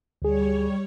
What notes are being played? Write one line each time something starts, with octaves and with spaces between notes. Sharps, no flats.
D2 G3 G#4 C#5